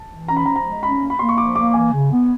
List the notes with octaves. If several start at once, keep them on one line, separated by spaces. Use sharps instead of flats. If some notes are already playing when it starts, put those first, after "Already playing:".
Already playing: A5
E3
C#4 A#5
B5
F3 A#5
A#5
G#3
C#4 B5
A#3
B5
A#3 C6
C#6
F3 D6
A#3 D6
E3 G#5
C#3
B3